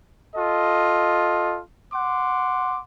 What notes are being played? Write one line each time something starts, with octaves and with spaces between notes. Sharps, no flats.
F4 A4 D#5
F#5 C6 D6